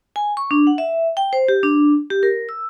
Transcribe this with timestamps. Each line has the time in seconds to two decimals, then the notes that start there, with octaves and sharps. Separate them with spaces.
0.16 G#5
0.37 C#6
0.51 D4
0.67 F#5
0.78 E5
1.17 G5
1.33 C5
1.48 G4
1.63 D4
2.10 G4
2.23 A#4
2.49 E6